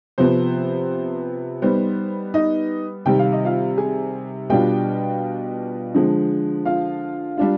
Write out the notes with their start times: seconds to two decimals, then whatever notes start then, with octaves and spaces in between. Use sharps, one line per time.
0.18 C3 F3 B3 C5
1.62 G3 B3 D#4 C5
2.34 D#4 D#5
3.06 C3 D#3 G3 G5
3.19 F5
3.33 D#5
3.45 F4 F5
3.77 G#4 G#5
4.50 B2 G3 D4 F4 G4 G5
5.95 D3 F3 G#3
6.65 F4 F5
7.37 G3 D4 F4